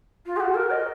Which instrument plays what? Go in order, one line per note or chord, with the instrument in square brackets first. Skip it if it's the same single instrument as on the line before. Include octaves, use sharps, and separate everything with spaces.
[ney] F4
G#4
F#4
A#4
D#5